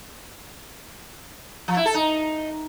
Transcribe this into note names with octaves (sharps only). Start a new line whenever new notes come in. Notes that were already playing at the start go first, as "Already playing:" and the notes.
F3
E4
A4
D#4